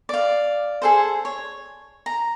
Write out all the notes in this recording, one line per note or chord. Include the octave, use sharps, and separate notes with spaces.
D5 F5
G#4 A4 C5
C#5
A#5